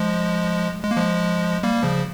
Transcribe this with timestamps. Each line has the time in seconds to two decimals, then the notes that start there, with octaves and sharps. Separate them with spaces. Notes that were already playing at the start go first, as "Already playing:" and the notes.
Already playing: F3 G#3
0.84 G#3
0.91 A#3
0.97 F3 G#3
1.63 G3 A#3
1.84 C#3 F3